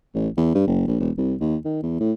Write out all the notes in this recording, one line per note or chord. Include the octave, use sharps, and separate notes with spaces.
A1
E2
G2
F#1
A#1
E1
C2
D#2
D#3
E2
A2